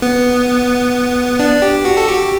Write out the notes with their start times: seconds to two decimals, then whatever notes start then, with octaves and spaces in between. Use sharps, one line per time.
0.02 B3
1.39 D4
1.62 G4
1.85 F#4
1.97 A4
2.08 G4